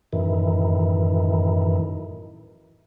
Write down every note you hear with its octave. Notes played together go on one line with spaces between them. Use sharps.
F#2 A2 D#3 E3